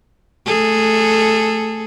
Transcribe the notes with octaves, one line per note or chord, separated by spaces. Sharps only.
A3 G#4 A4